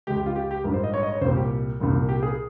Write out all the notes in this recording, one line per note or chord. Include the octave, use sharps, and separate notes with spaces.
C#2 C#3 G#3 G4
G4
F4
G4
G4
A#1 G#2 G3 A#4
C5
D#5
C#5
D#5
C#5
C2 A#2 G3 C5
G4
C2 A#2 G3
G4
G#4